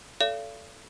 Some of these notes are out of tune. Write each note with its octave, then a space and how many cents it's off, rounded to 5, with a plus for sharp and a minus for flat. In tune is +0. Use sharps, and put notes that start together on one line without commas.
A4 +0 D5 -35 F5 -35